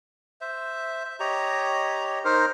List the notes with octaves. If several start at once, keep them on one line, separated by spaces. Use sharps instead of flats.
C5 E5
E5
G4 C#5 D#5 A#5
D#4 A#4 C5